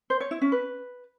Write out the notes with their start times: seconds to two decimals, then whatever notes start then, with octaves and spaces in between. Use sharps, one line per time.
0.10 C5
0.21 C#5
0.31 E4
0.41 C#4
0.52 B4